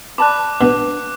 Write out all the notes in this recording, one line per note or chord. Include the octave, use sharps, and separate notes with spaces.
D5 A5 B5 D6 F#6
B2 D4 B4